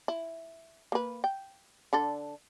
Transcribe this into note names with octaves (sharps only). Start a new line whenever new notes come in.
E4
A#3 B4
G5
D3 D4 A4